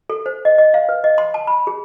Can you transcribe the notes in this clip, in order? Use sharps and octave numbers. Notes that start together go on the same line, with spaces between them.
A4
C5
D#5
D#5
F5
B4
D#5
C6
A5
B5
G#4